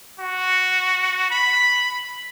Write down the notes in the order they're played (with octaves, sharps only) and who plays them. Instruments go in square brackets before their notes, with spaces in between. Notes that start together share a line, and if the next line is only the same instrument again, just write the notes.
[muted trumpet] F#4
B5